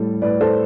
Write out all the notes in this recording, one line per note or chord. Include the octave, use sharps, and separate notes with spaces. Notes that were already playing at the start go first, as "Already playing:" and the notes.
Already playing: A2 G3 A4
A2 B4 D5
A4 C5